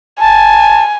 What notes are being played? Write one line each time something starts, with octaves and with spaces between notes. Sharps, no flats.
G#5 A5